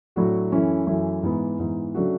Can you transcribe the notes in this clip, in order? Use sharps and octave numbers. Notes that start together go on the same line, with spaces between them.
A2 F#3 A3 D4 F#4
F#2 E3 A3 C#4 E4
F#2 E3 A3 C#4 E4
G#2 E3 B3
G#2 E3 B3
C#3 F#3 A3 D4 F#4